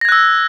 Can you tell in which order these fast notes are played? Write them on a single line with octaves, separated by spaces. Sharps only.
A#6 G#6 F#6 E6